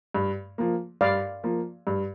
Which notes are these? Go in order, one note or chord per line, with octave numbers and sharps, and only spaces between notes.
G2
F3 A#3
G2 D5 F5
F3 A#3
G2